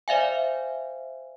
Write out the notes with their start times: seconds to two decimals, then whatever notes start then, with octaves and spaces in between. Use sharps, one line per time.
0.08 C5 D5 E5 F5 G#5